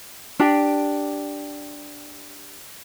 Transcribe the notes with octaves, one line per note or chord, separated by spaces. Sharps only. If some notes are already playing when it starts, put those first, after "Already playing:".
D4 G4